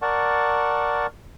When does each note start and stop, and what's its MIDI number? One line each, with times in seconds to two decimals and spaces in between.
0.02 1.07 70
0.02 1.07 74
0.02 1.07 78
0.02 1.07 81
0.02 1.07 85